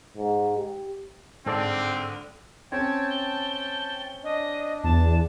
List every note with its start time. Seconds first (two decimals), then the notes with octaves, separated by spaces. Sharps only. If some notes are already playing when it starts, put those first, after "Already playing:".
0.17 G#2
0.57 G4
1.46 G#2 D3 C4 A4 D5
2.72 C4 C#4 G5 A5 G#6
3.11 G7
4.23 D4 D#5
4.84 E2 A5